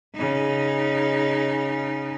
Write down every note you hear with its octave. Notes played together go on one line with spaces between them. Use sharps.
C#3 D#4